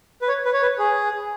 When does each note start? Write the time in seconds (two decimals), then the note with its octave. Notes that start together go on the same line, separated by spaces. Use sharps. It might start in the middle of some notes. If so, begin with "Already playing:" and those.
0.22 B4
0.28 C#5
0.45 B4
0.54 C#5
0.62 B4
0.79 G#4